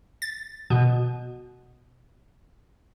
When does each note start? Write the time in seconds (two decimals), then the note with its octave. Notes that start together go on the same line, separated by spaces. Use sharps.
0.22 A6
0.70 B2